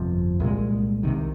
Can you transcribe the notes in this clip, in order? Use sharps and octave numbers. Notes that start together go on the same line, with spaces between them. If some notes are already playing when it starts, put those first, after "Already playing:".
Already playing: G1 F2 C3 F3
C2 A#2 G#3
C2 C3 D#3